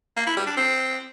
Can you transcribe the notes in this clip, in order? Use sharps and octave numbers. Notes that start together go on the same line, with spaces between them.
A#3
E4
G3
D4
C4